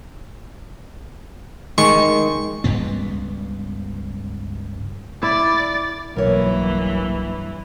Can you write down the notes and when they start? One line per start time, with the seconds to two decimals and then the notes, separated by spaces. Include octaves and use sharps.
1.78 D#3 G#3 C#6
2.64 C#2 G2 B3
5.23 E4 D5
6.16 B1 G2 E3 F#3 A#3 A#4 C#5